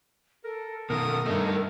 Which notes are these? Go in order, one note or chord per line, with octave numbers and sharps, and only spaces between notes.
A4 A#4
B2 D#3 A#4 D#6
G2 D#3 A3 D#4 A4